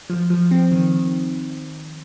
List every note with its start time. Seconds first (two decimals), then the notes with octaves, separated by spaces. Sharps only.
0.10 F3
0.30 F3
0.51 C4
0.71 D#3
0.93 D#3